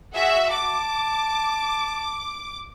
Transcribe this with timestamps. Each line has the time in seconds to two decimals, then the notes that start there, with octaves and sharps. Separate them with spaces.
0.14 F#4 G#4 E5
0.51 A5 D6